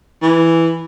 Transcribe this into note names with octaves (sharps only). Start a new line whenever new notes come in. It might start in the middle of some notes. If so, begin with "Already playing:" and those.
E3